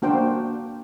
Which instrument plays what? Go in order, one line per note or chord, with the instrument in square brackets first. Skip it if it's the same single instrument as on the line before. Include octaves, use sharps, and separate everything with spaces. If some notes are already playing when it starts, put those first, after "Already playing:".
[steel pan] A#3 D4 F#4 C5 G5